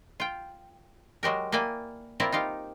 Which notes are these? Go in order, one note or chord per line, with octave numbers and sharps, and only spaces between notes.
F4 G5
F#3 G#3 G4 A#4
A#3 E4 D5 G5 G#5
C4 E4 F4 A#4 D5
D#4 F4 G4 F5